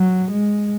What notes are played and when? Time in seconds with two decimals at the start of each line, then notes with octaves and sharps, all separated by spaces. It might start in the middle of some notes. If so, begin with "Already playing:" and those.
Already playing: F#3
0.32 G#3